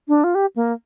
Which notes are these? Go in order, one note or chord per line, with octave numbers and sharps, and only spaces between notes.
D4
F4
G4
A#3